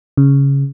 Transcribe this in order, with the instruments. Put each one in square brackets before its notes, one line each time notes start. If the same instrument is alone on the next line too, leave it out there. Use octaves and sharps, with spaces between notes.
[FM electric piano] C#3